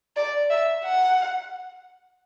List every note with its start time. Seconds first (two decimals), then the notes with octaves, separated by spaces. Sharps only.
0.16 D5
0.50 E5
0.84 F#5